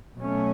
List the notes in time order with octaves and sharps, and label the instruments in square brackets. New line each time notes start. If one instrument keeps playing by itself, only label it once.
[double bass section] B2 F#3 A3 C#4